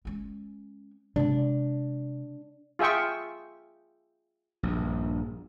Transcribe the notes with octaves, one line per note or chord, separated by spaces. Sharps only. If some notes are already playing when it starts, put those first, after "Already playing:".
G#3 C#4
C3 G#3 D4
F4 G#4 E5 G5 C#6
A#1 G2